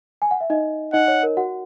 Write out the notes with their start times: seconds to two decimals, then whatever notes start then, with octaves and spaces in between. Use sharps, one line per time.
0.22 G#5
0.31 F#5
0.41 E5
0.50 D#4 D#5
0.93 D#4 D#5 F#5
1.08 C#5
1.23 A#4
1.37 F#4 F#5